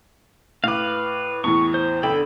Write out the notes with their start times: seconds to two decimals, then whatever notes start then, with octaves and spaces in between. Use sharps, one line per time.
0.64 A2 B4 F5 D6
1.44 E2 A2 E3 C#6
1.74 C5
2.03 G1 D3 A4 G5 B5